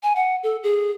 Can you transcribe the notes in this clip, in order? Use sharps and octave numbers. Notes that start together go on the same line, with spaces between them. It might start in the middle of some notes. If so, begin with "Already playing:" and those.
G#5
F#5
A4
G#4